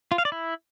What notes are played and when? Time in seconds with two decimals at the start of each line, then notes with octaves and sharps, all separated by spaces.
0.12 F4
0.18 F5
0.25 D5
0.32 E4